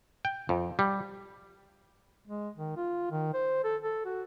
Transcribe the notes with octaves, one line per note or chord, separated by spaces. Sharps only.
G5
F2
G3
G#3
D#3
F4
D#3
C5
A4
A4
F#4